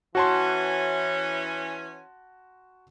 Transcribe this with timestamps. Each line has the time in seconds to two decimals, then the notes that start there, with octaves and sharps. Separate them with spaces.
0.15 E3 C#4 F#4 A5 C6